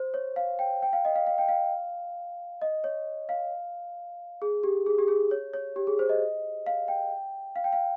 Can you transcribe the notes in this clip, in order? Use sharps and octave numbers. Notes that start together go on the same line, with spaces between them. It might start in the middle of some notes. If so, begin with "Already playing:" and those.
Already playing: C5
C#5
F5
G5
G5
F5
D#5
F5
F5
G5
F5
D#5
C#5
F5
G#4
G4
G#4
G4
G#4
C#5
C#5
G4
G#4
C5
D#5
F5
G5
F5
G5
F5